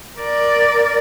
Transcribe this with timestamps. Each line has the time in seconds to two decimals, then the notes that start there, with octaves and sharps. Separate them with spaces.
0.19 A#4 D5